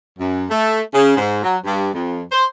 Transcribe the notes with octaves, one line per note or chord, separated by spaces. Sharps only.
F#2
A3
C#3
G#2
F#3
G2
F2
C5